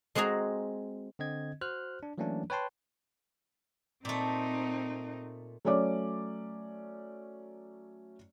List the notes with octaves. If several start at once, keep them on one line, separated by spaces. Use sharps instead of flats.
G#3 C4 F#4 G#4 A#5
D3 C4 D#5 G#6
F#4 C5 F6 F#6
D4
E3 F#3 A3 A#3 C#4 D4
B4 C#5 G5 A5 C6
A#2 A3 C4 D#4
F#3 A3 C#4 D5 D6